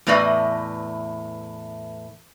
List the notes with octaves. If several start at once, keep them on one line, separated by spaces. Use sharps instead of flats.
E2 A2 A3 B4 D5 D#5